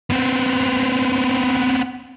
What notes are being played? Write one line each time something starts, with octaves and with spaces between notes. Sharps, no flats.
B3 C4